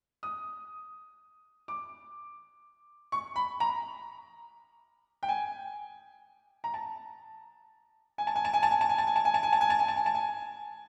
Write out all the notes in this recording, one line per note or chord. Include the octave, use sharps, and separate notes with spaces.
D#6
D6
C#6
B5
A#5
G5
G#5
A#5
A5
G#5
A5
G#5
A5
G#5
A5
G#5
A5
G#5
A5
G#5
A5
G#5
A5
G#5
A5
G#5
A5
G#5
A5
G#5
A5
G#5